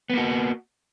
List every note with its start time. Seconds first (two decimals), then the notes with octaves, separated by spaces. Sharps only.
0.10 B3
0.13 A#3
0.17 F#4